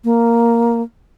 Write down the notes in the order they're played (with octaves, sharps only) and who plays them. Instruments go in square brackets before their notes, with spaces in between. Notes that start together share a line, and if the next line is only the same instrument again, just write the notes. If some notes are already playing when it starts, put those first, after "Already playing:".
[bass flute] A#3